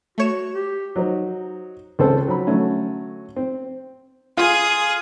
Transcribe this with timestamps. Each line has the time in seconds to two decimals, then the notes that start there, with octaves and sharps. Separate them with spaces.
0.18 A3 F#4 C#5 E7
0.54 G4
0.96 F#3 D#4 C5
1.99 C#2 C#3 C4 A4 C5 A5
2.28 F#3 B5
2.47 D3 F#3 A3 C#4
3.36 C4
4.37 F4 G#4 D#6